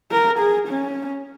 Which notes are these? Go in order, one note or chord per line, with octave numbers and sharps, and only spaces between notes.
A#4
G#4
C#4